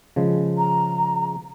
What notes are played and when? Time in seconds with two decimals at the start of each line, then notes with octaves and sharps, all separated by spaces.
0.16 C#3 F3 G#3
0.58 A#5